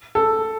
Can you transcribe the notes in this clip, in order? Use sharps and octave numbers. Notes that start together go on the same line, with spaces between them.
A4